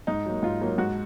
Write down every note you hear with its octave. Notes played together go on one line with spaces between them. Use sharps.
G#2 D#4
F#3 A#3
G#2 F4
F#3 A#3
G#2 F#4